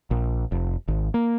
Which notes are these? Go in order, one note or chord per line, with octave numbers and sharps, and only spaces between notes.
A#1
F1
G#1
A#3